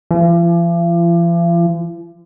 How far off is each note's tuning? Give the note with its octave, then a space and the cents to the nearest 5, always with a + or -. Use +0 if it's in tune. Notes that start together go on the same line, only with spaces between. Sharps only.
F3 -45